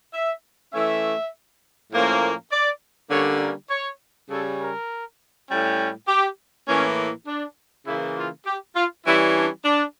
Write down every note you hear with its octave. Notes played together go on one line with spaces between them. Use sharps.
E5
E3 A3 C#4 E5
A2 F3 A#3 C#4
D5
D3 G3 A#3 C#4 C#5
A#4
C#5
C#3 G3 C#4 A4
A#4
A2 G3 C#4
G4
A2 E3 A#3 C#4
D4
C#3 E3 A#3 E4
F4
G4
F4
E3 G3 C#4 E4
D4
D4